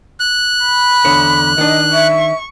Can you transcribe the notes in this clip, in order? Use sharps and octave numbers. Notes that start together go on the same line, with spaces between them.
F#6
B5
E2 D3 C#5
D#3 D4 D#5
E5 C#6